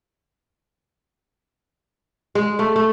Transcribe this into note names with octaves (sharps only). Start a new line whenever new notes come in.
G#3
A3
A3